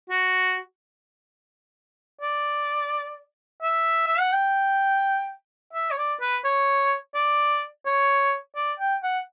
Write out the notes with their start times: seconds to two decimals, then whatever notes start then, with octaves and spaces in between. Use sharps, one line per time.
0.10 F#4
2.21 D5
3.63 E5
4.07 E5
4.19 F#5
4.33 G5
5.73 E5
5.91 C#5
5.98 D5
6.21 B4
6.45 C#5
7.15 D5
7.86 C#5
8.56 D5
8.79 G5
9.03 F#5